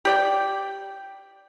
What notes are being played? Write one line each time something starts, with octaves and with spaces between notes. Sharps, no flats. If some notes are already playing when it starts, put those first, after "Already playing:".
G4 D5 G5